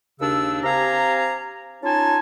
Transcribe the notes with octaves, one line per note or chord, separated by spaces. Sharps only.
D#2 C#3 D4 E6
C4 G4 F5 G#5 A#5
C#4 D#4 F4 G#5 A5